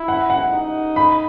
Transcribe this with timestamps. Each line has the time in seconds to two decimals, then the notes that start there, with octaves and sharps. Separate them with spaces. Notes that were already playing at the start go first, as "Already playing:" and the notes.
Already playing: E4
0.08 F#5
0.30 F#5
0.53 D#4
0.96 B5